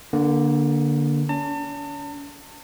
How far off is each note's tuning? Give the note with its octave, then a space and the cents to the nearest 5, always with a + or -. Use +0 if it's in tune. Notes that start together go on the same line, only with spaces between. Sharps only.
D3 +0 A#3 +25
C#4 +45 A5 +40